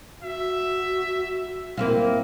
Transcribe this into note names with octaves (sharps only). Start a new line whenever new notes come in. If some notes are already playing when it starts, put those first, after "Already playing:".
F#4 E5
A#3 C4 E4 F4